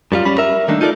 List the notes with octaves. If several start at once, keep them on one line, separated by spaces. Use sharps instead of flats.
F#2 G3 F4
G3 C#4 B5
A#4 E5
D#3 G3 A3 A#3 D4 D#4
D#4 F4 A4 A#4 D5